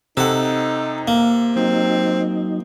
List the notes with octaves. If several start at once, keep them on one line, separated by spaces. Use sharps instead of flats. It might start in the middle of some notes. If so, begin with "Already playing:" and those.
C3 D#4 A4 F#5
A#3
F#3 C4 D#4